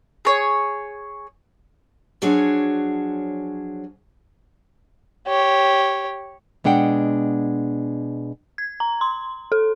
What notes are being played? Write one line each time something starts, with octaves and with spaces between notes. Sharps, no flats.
G#4 C#5
F3 F#3 D4 F#4 G#4 C#5
G4 C#5
B2 G#3 D4 F#5 G5
G#6
A#5
C6
A4